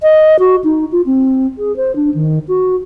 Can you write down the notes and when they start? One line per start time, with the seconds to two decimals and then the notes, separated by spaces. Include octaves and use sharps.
0.02 D#5
0.39 F#4
0.64 D#4
0.92 F4
1.06 C4
1.58 G#4
1.76 C5
1.96 D4
2.14 D#3
2.48 F#4